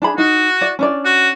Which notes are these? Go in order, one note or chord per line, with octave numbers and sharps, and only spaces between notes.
D4 G#4 B5
D#4 F#4
D5
C#4 D4 D5
F#4